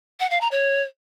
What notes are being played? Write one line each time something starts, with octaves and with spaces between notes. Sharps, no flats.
F#5
F5
A#5
C#5